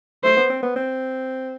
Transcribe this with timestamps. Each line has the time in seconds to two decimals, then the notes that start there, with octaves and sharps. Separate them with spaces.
0.24 A3 C5
0.37 B3
0.50 C4
0.63 B3
0.76 C4